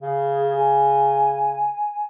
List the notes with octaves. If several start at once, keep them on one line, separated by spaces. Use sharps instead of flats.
C#3 G#4
G#5